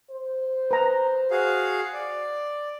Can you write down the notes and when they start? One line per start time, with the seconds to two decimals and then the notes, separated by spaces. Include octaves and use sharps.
0.11 C5
0.71 B4 A#5
1.31 F#4 G#4 F5
1.93 D5